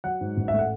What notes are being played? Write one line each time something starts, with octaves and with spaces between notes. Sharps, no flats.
F#3 F#5
G#2
A1
E5
A3
F#5